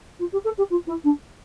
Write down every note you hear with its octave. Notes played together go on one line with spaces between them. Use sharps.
F4
G4
A4
G4
F4
E4
D4